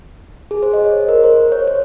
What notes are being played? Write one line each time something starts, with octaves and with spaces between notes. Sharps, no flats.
G#4
C5
D#5
C#5
A#4
C5
C#5
C#5